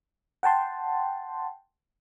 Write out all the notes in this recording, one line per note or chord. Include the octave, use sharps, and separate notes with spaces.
F#5 G5 A5 C6